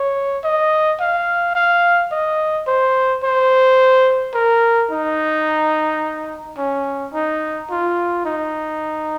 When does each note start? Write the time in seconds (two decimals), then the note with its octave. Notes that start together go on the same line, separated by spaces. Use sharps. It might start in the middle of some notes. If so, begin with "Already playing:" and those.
Already playing: C#5
0.44 D#5
1.00 F5
1.55 F5
2.12 D#5
2.67 C5
3.24 C5
4.34 A#4
4.91 D#4
6.58 C#4
7.14 D#4
7.70 F4
8.25 D#4